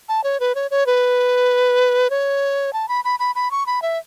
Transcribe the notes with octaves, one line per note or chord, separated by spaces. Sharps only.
A5
C#5
B4
C#5
C#5
B4
C#5
A5
B5
B5
B5
B5
C#6
B5
E5